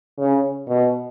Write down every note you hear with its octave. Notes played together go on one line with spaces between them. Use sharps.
C#3
B2